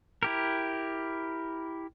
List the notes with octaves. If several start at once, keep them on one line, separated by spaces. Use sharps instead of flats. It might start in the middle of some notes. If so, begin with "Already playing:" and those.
E4 G4 A#4